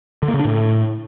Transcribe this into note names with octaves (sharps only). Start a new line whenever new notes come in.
D3
A#3
C#3
D4
A2